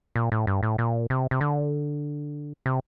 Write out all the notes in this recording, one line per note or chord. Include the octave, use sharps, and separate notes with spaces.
A#2
A2
G2
A2
A#2
C3
C3
D3
C3